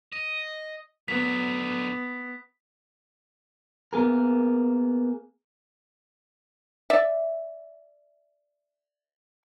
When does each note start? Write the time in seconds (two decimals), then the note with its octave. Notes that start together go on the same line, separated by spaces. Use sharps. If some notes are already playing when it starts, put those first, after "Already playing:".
0.12 D#5
1.08 D3 F#3 B3 B6
3.93 A#3 B3 G#4 A#4
6.90 D5 E5